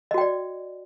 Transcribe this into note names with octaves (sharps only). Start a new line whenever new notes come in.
F#4 D5 D#5 G5